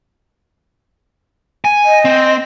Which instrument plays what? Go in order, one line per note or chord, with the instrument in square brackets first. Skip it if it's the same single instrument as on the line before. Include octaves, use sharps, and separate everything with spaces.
[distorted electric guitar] G#5
[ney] D#5
[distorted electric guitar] C4